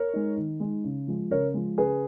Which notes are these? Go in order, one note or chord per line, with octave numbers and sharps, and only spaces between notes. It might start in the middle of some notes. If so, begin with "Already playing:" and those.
Already playing: A#4 C#5
G#3 D#4
D#3
G#3 D#4
C#3
F3 G#3
C#3 A#4 C#5
F3 G#3
C#3 G#4 B4